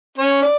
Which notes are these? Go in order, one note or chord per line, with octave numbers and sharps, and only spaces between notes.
C#4 C#5
D5